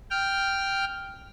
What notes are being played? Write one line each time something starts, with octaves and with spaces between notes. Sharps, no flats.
G5 F6